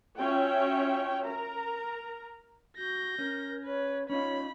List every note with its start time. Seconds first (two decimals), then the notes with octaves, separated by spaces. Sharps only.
0.17 C#4 F4 F#4 C#5 E5 G5
1.26 A#4 A#5
2.77 F#4 G6 A#6
3.18 C#4 A#4
3.65 B4 C#5
4.10 C#4 D#4 F4 C#5 B5